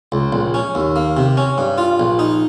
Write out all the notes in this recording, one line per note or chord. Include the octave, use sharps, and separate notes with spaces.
C#2
A#1
C#4
D#2
A#3
C3
C#4
G2
F4
A#1
D#4